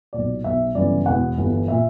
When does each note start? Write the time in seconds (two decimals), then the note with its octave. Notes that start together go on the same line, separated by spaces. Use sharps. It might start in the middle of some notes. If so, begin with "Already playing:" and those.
0.13 B1 A#2 D5
0.44 B1 B2 E5
0.75 G1 F#2 C#3 E3 D5
1.06 E1 E2 B2 F#5
1.38 G1 G2 E3
1.68 A#2 E5